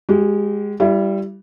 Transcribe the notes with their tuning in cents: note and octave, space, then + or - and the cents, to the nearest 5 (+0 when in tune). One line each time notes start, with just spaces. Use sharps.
G#3 -15 G4 -40
G3 +0 E4 +35